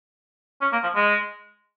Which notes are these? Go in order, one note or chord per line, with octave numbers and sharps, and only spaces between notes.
C#4
A#3
F3
G#3